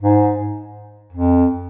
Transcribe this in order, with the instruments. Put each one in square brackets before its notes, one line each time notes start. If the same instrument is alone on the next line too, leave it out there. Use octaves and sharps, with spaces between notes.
[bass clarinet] G#2
F2